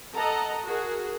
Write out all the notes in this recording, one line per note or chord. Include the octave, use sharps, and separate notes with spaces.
A4 D#5 F#5 A#5
F#4 G#4 A#4